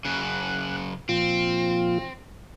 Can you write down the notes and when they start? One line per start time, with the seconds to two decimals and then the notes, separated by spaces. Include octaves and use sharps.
0.05 F#2 C#3 F#6
1.09 A#2 F3 C4 F4